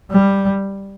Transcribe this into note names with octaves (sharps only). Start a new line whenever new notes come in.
G3